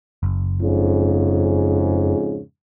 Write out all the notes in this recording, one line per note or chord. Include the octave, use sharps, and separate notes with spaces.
F#1
F2 G#2 C#3